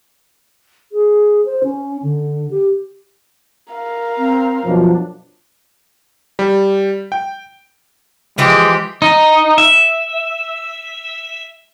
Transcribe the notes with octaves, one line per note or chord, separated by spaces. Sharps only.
G#4
C5
C#4
D3
G4
A#4 F5
C4
F#2 B2 F3 D4
G3
G5
E3 F3 G#3 G4
D#4
E5